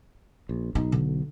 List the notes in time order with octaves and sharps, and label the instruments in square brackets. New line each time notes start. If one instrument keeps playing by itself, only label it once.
[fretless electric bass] A#1
[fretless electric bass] B1 [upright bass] D#4
[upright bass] D3